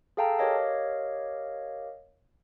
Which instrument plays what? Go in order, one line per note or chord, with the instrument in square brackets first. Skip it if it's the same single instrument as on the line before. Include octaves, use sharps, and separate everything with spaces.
[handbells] G#4 A4 F5 G5 A5 A#5
G4 A#4 C#5 D#5 F5